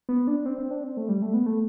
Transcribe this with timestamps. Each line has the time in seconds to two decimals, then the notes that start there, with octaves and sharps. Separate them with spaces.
0.09 B3
0.27 D4
0.46 C4
0.58 C4
0.71 D4
0.84 C4
0.97 A3
1.09 G3
1.22 A3
1.34 B3
1.46 A3